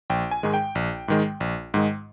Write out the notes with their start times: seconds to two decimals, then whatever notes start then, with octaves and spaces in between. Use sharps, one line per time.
0.10 A#1 G5
0.31 G#5
0.43 G#2 D#3 G#3
0.54 G5
0.75 A#1
1.08 G#2 D#3 G#3
1.40 A#1
1.74 G#2 D#3 G#3